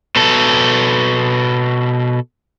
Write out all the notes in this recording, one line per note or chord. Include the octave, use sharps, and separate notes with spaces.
B2 A4